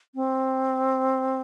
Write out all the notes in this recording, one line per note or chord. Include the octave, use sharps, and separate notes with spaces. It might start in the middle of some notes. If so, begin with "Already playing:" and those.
C4